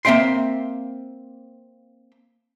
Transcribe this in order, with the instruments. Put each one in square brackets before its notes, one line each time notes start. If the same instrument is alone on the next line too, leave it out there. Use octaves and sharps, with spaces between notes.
[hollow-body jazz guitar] A#3 C4 E5 G5 C6